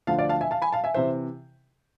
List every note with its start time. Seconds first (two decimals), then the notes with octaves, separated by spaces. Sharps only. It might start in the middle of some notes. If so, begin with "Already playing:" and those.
0.07 D2 D3 F3 F5 A5
0.18 D5 F5
0.29 F5 A5
0.41 E5 G#5
0.51 F5 A5
0.62 G#5 B5
0.73 F5 A5
0.84 E5 G#5
0.94 C3 E3 C5 E5